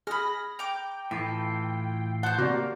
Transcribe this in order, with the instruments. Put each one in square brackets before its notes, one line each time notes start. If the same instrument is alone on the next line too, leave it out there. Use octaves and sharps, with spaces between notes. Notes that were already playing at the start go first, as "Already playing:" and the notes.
[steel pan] G#4 [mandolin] B5 F6 [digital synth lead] A#6
[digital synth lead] G5 [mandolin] A#5 D6
[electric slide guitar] A2 E3 F4 [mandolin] A4
[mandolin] C5 G6 [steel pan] F#5 [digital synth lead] A5
[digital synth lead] C3 [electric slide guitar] A#3 [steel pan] F#4 D5